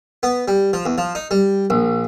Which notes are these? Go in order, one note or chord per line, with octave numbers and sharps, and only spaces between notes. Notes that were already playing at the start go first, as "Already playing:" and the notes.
B3
G3
F3
E2
F3
D#4
G3
A#1